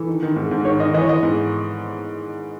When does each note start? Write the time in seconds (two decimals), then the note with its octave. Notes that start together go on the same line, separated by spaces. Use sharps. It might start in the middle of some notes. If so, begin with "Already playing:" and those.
Already playing: E3 A4
0.08 D#3
0.23 D#3
0.36 G#2
0.51 G#2
0.65 D#3 C#5
0.79 D#3 D#5
0.94 E3 D#5
1.01 C#5
1.09 E3 D#5
1.23 G#2